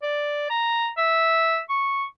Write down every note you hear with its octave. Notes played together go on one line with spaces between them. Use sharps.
D5
A#5
E5
C#6